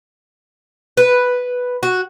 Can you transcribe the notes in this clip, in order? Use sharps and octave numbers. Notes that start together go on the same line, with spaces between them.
B4
F#4